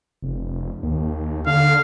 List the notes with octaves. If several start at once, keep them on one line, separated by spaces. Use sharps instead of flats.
F1
D#2
D3 F5